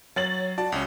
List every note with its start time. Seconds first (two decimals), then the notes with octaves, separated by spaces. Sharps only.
0.16 F#3 C#5 A6 F#7
0.58 F#4 D5 A5
0.72 C#2 C#4